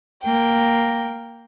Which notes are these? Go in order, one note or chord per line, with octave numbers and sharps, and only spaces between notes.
A#3 G5